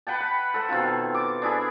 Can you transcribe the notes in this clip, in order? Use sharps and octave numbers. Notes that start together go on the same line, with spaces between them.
B4 F#5 G5 A5
B5
A4 C5 F#5
B2 D#3 C4 F4
D6
D4 E4 G#4 A4